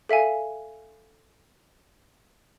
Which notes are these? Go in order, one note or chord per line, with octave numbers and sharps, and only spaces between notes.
A4 E5 F5 G#5